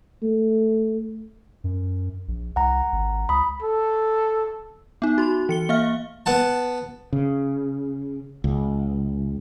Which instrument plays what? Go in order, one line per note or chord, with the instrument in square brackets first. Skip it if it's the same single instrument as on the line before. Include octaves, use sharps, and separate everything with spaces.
[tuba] A3
[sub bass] F#2
A#1
[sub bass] C2 [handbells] F#5 A#5
[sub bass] G#1
[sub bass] C#2 [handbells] B5 D#6
[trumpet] A4
[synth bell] B3 D#4
F#4 C6
E3 C#7 G7
A#3 E5 F5 F6
[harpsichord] B3 F#5 A5
[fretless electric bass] C#3
C#2